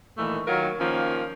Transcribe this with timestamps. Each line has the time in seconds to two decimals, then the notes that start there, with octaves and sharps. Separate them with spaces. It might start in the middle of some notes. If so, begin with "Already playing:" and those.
0.18 A#2 D#3 E3 A3
0.47 D#3 F#3 F4 A#4
0.80 D#3 F3 A#3 C#4